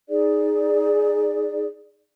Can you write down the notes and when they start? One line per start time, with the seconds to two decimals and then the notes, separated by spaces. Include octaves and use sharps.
0.09 D#4 G#4 D5